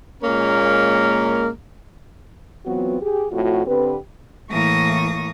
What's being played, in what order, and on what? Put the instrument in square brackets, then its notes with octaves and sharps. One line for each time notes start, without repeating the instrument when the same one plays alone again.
[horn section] A#2 G#3 A#3 C#4 A#4
[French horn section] E3 F#3 B3 C4 F4 F#4
G4 G#4
F2 A2 F4 F#4
D3 C4 G4 B4
[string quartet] A2 E3 A#3 C#6 D#6 A#6